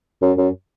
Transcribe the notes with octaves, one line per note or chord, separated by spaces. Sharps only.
F#2
F#2